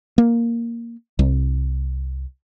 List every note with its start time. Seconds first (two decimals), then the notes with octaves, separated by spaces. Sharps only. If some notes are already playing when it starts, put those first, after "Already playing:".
0.18 A#3
1.19 C2